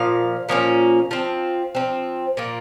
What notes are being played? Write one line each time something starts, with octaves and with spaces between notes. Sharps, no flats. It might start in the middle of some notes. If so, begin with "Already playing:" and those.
Already playing: A#2 F3 F5
A#2 F3 A#3 C#4
F3 C4
F3 C4
A#2 F3 A#3